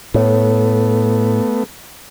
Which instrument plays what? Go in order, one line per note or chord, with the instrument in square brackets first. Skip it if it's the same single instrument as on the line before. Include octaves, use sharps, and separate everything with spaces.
[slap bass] A2 [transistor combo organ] A3 B3